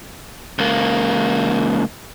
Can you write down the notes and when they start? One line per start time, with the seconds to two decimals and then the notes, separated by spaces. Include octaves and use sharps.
0.59 C#2 A#3